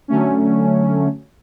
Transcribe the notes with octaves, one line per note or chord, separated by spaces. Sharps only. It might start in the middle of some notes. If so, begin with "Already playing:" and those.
D3 F#3 A3 C#4